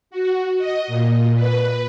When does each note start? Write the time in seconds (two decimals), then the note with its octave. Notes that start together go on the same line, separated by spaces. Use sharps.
0.11 F#4
0.58 D#5
0.87 A#2
1.35 B4